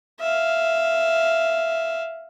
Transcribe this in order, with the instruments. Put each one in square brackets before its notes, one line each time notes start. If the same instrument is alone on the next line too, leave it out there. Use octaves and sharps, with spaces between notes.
[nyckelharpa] E5 F5